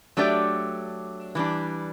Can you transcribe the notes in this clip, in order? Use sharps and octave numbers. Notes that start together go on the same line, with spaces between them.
F#3 A3 D4 G4 D5
E3 G3 D4